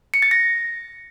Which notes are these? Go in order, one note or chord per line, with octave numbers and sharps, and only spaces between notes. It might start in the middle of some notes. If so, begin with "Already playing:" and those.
C#7
A6
A#6